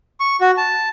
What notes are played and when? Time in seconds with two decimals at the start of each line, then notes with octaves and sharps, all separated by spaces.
0.20 C#6
0.41 F#4
0.57 A5